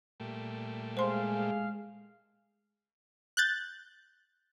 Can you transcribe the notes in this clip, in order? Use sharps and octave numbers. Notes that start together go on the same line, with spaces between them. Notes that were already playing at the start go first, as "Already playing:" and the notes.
A#2 G3 A3
G#3 G#4 C5 F5 C6
F#6 G6 A6